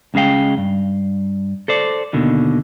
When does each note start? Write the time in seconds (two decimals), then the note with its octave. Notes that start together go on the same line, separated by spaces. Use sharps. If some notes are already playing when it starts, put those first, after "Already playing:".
0.14 C#2 C#3 G#3 F5 G5
0.58 G2
1.68 A4 C5 D5
2.13 D#2 B2 D3 D#3